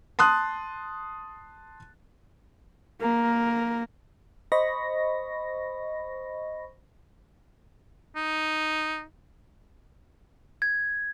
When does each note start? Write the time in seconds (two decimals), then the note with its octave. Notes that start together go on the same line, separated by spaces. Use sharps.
0.19 A5 C6 D#6 F#6
3.01 A#3 A#4
4.52 C5 D#5 B5 C#6 A#6
8.16 D#4
10.62 G#6